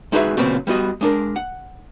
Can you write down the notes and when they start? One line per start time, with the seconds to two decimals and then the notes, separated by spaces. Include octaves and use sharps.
0.12 G#3 D#4 F#4 G#4 B4 E5
0.37 A#2 C#3 F#3 B3 C4
0.67 G3 B3 F#4 D#5
1.01 G#3 D4 A#4
1.36 F#5